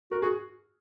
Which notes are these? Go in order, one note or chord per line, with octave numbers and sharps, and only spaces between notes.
F#4 A#4
F#4 G#4